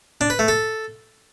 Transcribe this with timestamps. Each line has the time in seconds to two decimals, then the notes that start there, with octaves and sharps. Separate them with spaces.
0.21 D4
0.30 B4
0.39 A3
0.48 A4